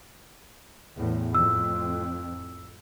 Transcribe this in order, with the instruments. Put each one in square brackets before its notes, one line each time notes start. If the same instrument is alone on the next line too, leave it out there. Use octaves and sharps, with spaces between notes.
[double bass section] E2 A2
[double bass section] F2 A2 [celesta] E6